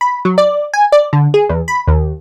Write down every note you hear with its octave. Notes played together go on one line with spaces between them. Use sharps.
B5
F#3
D5
G#5
D5
D3
G#4
E2
B5
D#2